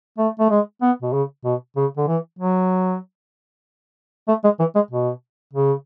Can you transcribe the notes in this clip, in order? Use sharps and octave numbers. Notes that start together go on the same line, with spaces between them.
A3
A3
G#3
B3
B2
C#3
B2
C#3
D3
E3
F#3
A3
G#3
E3
G#3
B2
C#3